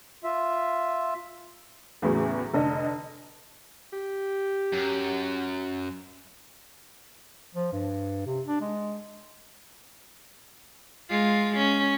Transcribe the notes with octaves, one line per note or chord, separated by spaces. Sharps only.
F4 E5
E2 A2 C#3 E3 F#3
F1 D3 D4 D#5
G4
F#2
F3
G2
C3
D4
G#3
G#3 F4
C#4